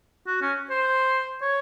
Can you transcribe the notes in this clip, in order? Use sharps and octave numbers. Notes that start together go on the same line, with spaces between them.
F#4
C#4
C5
C#5